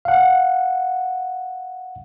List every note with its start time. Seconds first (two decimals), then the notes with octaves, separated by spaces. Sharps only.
0.05 F5 F#5